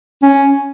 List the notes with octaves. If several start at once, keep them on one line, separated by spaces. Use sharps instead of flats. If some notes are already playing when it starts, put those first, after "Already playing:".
C#4